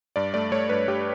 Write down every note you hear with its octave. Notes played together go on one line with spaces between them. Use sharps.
G2 D5
A3 D5
A3 C#5
G2 B4
G2 G4